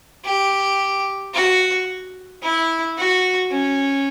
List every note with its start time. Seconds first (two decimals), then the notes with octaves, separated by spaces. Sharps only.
0.25 G4
1.34 F#4
2.43 E4
2.98 F#4
3.51 C#4